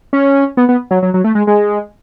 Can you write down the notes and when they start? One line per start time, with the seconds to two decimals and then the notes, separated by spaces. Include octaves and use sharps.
0.13 C#4
0.57 B3
0.69 B3
0.91 F#3
1.03 F#3
1.14 F#3
1.24 A3
1.35 G#3
1.47 G#3